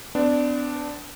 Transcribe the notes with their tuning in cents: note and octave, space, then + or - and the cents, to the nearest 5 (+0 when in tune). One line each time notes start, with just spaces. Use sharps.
B3 +45 D4 +0